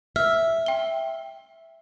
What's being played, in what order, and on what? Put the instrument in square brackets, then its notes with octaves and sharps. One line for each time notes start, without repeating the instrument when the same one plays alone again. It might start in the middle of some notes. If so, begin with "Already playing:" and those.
[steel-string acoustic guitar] E5 [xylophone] F6
[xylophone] G5 G7